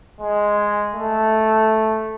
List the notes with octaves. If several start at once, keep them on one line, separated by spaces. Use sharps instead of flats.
G#3
A3